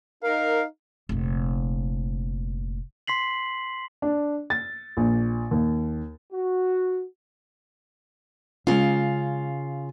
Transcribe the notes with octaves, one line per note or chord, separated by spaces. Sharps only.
D#4 A#4 F5
F1 A#2
C6 B6 C7 F#7
D4
A6
A#1
D#2
F#4
C#3 G#3 C#4 F4